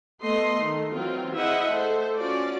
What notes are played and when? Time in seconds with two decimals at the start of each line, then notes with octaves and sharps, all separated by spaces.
0.21 A3 B3 D#5 C6
0.57 D#3 A3
0.92 E3 F#3 C4 F4
1.35 E4 G#4 C5 D#5 E5 F#5
1.67 A3 A4 C5
2.18 C#4 F4 F#4 D5